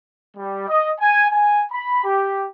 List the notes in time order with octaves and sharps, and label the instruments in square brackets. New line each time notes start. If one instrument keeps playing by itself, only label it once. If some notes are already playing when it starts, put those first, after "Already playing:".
[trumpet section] G3
D#5
G#5
G#5
B5
G4